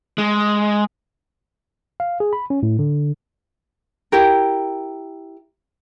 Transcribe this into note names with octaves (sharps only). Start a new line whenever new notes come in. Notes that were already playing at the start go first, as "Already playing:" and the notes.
G#3
F5
G#4
B5
C#4
A2
D3
E4 G4 A#4